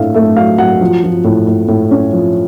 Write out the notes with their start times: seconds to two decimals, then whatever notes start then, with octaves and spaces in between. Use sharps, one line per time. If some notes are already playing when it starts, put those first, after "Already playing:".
Already playing: A2 A3 D4 E5 F5
0.14 A3 E5
0.36 F#3 F5
0.58 F#3 F#5
0.81 F3
1.04 F3
1.24 A2
1.48 A2
1.68 A2
1.91 C#4
2.13 F3